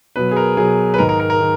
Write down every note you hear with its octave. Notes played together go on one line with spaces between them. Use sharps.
B2 F#3 B4
G#4
A#4
B2 F#3 G#4
B4
G#2 D#3 G#3 A#4
A#4
A#4
A#4
D#3